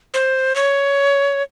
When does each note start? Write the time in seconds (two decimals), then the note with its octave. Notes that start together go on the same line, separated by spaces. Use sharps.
0.14 C5
0.56 C#5